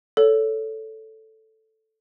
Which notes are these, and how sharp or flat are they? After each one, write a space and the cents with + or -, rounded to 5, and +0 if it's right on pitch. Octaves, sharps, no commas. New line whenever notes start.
A4 +0 C#5 +25